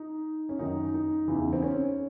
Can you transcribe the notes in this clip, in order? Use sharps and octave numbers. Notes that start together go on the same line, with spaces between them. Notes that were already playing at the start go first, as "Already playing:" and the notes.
Already playing: D#4
C#4
F#2 D#3 D#4
D#4
E2 C#3 E3
C4
C#4